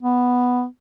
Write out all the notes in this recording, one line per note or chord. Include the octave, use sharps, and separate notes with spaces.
B3